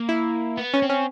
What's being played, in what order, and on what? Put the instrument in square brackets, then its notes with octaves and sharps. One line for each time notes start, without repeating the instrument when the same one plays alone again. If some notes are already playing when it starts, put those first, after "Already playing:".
Already playing: [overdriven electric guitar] A#3
[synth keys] E4
[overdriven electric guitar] B3
[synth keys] C#4
[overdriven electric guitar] C4
[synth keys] C#4